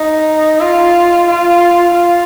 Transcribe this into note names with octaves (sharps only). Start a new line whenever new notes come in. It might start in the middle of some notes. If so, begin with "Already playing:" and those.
Already playing: D#4
F4
F4
F4